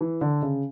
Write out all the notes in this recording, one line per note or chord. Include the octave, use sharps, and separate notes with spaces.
E3
D3
C#3